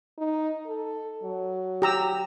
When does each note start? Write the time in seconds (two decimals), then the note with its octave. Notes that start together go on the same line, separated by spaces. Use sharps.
0.18 D#4
0.67 A4
1.23 F#3
1.82 G4 A#5 E6